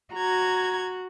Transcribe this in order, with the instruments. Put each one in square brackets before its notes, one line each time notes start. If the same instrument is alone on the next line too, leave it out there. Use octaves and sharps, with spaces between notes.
[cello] F#4 [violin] A#5 G#6